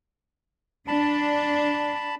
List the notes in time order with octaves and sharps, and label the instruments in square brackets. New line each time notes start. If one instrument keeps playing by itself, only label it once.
[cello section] D4 [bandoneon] A5 B5